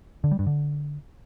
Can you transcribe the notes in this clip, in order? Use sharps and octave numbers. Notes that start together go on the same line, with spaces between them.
D3
G3
G2
D3